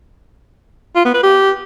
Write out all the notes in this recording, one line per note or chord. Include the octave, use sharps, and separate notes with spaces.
F4
B3
B4
G4